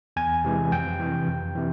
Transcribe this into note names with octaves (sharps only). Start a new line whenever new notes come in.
E2 G#5
C3 E3 G#3
F2 G5
C3 E3
F2
C3 E3